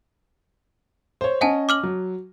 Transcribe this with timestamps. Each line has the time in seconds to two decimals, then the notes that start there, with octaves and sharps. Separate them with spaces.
1.21 C5 C#5
1.41 C#4 D#5 F#5 G#5 A5
1.69 D6 F6 F#7
1.83 F#3